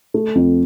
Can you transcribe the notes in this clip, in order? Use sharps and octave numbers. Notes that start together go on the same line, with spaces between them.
A3
F2